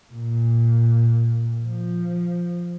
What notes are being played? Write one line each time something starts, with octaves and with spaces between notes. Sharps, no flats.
A#2
F3